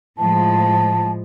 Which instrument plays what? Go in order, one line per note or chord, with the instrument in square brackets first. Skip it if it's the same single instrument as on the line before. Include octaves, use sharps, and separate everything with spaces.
[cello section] A2 F3 G#3 [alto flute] A5